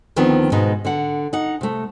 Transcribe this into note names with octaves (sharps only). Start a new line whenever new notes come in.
D2 D#3 F3 B3 C4
G#2 B2 G#3 B3 D#4
D3 F#5
D#4 F#5
C3 A3